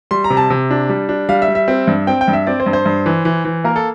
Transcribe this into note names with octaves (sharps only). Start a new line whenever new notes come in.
G3 C6
A#5
C3
A5
C3
D4
G3
D4
G3 F5
E5
G3
E5
C4
G2
C4 G5
G5
G2
E5
C4 D5
C5
G2
C5
G2
E3
E3
E3
A#3 A#4
A4